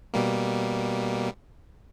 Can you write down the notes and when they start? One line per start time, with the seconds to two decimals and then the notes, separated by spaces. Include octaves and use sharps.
0.14 B2 G3 A#3